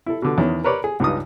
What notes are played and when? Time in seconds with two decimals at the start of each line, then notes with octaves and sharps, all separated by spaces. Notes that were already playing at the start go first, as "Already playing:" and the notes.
0.06 E4 A4
0.22 B2 D3
0.38 E2 D#3 C#4
0.64 A#4 B4 C#5 D5
0.84 G#4
1.00 C#2 G2 D#4 F4 D#6